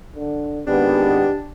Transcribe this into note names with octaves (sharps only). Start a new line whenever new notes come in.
D3
G#1 G#3 B3 D4 G4